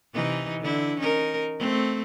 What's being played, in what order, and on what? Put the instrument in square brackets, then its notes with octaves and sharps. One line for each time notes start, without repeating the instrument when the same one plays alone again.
[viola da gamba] C3 E3 D#4
D3 E4
C#4 D#4 A#4
A3 C4